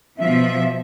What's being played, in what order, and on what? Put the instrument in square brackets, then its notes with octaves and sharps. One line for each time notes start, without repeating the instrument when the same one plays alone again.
[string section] B2 F3 [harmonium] E5